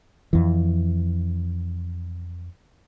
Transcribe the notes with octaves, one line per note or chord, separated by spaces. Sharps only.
F2 E3